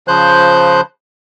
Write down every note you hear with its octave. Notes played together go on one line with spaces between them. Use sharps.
C#3 F3 C5 F#6 G6